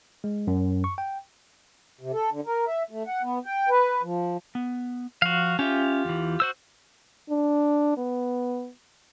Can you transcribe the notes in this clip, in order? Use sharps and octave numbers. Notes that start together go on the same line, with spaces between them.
G#3
F#2
C#6
G5
C3
A4
D3
A#4
E5
A3
F#5
B3
G5
B4
F3
B3
F3 F#4 F5
C#4 F4 G4 E5
E2 E3
F#4 C5 E6
D4
B3